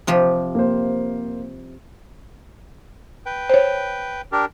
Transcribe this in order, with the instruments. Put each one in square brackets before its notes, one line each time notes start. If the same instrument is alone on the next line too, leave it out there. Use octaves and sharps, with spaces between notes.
[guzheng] C3 F3 G4
[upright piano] A#3 C5
[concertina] B4 G5
[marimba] C5 C#5
[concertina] D4 G4 A#4